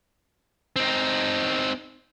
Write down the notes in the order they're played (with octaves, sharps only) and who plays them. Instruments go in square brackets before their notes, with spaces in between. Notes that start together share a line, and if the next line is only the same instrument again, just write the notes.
[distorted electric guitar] C4 D#4